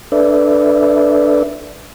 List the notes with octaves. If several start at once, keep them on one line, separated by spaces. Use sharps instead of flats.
D4 A4 B4 D5 E5